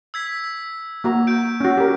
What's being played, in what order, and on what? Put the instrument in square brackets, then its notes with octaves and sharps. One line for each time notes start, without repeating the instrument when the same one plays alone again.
[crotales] E6 G#6 B6
[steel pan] A#3 F#4 A#5
[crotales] G6 D7
[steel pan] C#4 F#4
G4 A#4